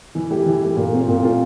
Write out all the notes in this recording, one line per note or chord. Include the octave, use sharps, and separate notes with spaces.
E3
A3 E4 G4
E3
A3 E4 G4
A#2
A3 C4 F4
A#2
A3 C4 F4